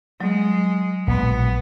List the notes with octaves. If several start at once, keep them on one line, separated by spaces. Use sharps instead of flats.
F#3 G#3
A#1 B2 G#3 B3